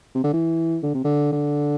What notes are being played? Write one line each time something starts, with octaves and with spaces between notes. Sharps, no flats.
C3
D3
E3
D3
C3
D3
D3